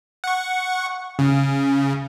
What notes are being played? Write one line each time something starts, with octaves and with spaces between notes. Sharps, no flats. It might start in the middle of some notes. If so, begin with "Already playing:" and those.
F#5 C#6
C#3